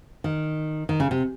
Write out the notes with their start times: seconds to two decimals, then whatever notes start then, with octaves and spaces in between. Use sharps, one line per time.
0.24 D#3
0.89 D#3
1.00 C#3
1.11 C3